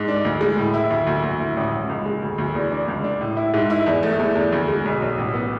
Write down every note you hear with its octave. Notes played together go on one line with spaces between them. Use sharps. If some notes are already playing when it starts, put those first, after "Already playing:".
Already playing: G#2
D4
D2
G#3
A2
E4
D2
D2
D2
E4
A1
A1
C#2
G#3
D2
D2
E2
D4
C#2
D4
A2
E4
G#2
E4
E2
A3
E2
E2
D2
G#3
B1
B1
A1
B3